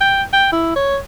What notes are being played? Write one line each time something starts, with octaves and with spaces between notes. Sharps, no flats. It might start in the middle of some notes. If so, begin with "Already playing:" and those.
G5
G5
E4
C#5